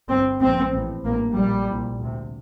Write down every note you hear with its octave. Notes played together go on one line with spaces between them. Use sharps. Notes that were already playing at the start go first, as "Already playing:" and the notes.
G1 G2 C4
A#1 A#2 C4
A1 A2
A1 G2 A#3
A#1 A#2 G3
C2 A#2
D2 C3